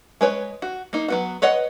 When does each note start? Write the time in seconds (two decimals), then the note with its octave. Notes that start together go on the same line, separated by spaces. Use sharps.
0.21 G#3 B4 C#5
0.62 F#4
0.93 A#3 D#4
1.08 F#3 B3 F#4
1.42 B4 C#5 D#5 F#5